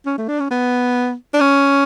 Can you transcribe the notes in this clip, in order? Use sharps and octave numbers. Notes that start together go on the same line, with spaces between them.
C#4
A3
D4
C#4
B3
D4
C#4